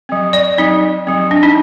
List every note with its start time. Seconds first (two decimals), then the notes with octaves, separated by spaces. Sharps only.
0.09 F#3 C4
0.33 D5
0.58 F#3 C4 D#4
1.07 F#3 C4
1.31 D4
1.43 D#4